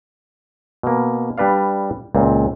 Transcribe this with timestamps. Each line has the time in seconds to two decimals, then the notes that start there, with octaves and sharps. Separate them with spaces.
0.83 B2 A#3
1.38 G3 D4 B4 D5 F5
2.15 C#2 A#2 C4